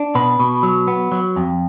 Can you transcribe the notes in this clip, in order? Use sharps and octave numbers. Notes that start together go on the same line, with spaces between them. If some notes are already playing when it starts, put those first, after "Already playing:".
Already playing: D4
B2 B4
B2
F#3
B3
F#3
F2